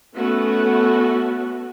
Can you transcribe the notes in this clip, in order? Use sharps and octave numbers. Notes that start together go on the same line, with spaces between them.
A3 B3 C#4 F#4